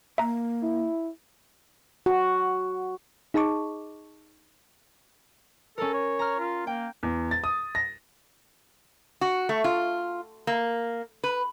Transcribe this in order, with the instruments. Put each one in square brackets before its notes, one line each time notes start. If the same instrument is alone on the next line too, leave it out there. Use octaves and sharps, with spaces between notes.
[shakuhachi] A#3 [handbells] E5 A#5
[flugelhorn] E4
[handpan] F#4
[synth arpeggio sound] D#4 G#4 D#5 A5 C#6 D6
[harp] C#4 A#4 [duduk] A4
[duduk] C#5
[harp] A#5 F6
[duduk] F4
[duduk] A#3 [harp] G5
[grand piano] E2
A6
D#6
A#6
[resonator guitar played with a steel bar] F#4
A3
F4
A#3
B4